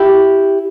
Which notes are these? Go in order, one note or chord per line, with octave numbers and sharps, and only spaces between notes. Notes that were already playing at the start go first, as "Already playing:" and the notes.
Already playing: E4 G4